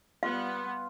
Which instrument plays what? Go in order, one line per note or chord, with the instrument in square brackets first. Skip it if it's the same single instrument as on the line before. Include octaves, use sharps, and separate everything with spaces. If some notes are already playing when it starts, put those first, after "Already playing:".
[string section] G3 B3 [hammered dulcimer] F4 [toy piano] F5